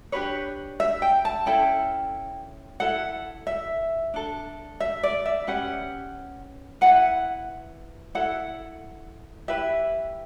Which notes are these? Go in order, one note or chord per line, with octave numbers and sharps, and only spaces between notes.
D4 G4 B4 C#5
E5
G5
A5
C#4 E4 A4 G5
E4 A4 F#5
E5
D4 A4
E5
D5
E5
C#4 G4 B4 F#5
E4 B4 F#5
E4 A4 F#5
E4 G4 B4 E5